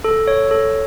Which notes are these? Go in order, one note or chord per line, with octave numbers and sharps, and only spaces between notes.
A4
C#5
A4